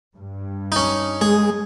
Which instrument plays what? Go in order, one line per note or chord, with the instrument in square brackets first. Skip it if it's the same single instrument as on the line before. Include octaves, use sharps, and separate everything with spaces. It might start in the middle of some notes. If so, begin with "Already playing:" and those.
[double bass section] G2
[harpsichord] C#4 D#4
[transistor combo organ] G#3 [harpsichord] G#4